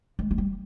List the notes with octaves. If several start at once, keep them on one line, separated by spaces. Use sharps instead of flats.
G#3
G#3
G3